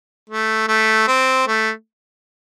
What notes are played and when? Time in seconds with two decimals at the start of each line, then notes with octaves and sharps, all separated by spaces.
0.29 A3
0.68 A3
1.08 C4
1.47 A3